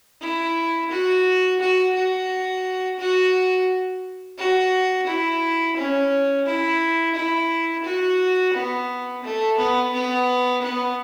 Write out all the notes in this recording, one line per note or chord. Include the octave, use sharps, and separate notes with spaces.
E4
F#4
F#4
F#4
F#4
F#4
E4
C#4
E4
E4
F#4
B3
A3
B3
B3
B3